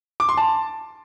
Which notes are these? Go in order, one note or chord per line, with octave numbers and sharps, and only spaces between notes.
D6
C6
A5